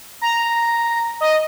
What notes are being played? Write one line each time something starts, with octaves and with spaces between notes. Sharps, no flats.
A#5
D#5